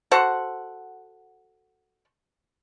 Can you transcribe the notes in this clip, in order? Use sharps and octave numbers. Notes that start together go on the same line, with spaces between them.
F#4 A4 C5 F#5